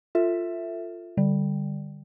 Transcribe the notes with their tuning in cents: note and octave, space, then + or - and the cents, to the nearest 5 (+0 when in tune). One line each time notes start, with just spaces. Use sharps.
F4 +0 A4 +25 E5 +0
D3 +0 G3 +0